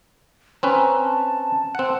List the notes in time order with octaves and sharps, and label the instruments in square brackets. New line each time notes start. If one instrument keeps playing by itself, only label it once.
[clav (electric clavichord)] C4 C#4 B4 [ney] A#5
[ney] A5
[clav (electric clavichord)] C4 F#5